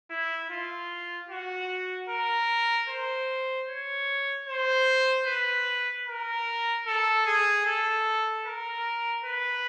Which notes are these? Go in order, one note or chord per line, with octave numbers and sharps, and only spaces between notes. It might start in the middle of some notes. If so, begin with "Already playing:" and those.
E4
F4
F#4
A#4
C5
C#5
C5
B4
A#4
A4
G#4
A4
A#4
B4